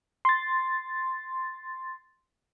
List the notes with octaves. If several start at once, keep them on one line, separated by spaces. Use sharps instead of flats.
C6 A6